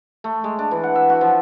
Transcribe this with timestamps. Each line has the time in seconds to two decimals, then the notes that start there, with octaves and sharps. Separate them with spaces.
0.24 A3
0.44 G#3
0.59 D4
0.71 E3
0.84 F#5
0.95 E5
1.10 F#4
1.21 F3